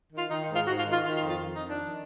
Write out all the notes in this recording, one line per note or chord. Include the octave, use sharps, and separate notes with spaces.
D#3
F4
D#3 D#4
D#4
G#2
F4
G#2 F#4
F4
D#3
F4
D#3 F4
F4
F2
F4
F2
D#4
D#3
D4
D#3